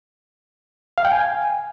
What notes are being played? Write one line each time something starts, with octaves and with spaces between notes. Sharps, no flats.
F5
G5
G#5